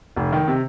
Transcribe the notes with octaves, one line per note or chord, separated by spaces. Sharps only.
F1
D#3
C3